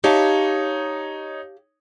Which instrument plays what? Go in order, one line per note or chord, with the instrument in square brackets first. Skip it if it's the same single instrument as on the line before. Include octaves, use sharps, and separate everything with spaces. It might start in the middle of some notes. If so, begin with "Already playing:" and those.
[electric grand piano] D#4 C#5 [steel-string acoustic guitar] G4 F5 A5